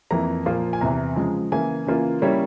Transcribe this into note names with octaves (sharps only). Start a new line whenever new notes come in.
F2 E3 A#3 A#5
A#2 F3 A#3 F4
G#5
E2 C3 E3 A#5
C#3 F3 G#3
C#3 E3 A#3 G#5
C#3 E3 A#3 F4
C#3 G3 A#3 C#4 E4 C#5